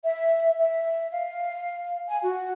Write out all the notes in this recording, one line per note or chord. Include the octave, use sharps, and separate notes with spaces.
E5
E5
F5
G#5
F#4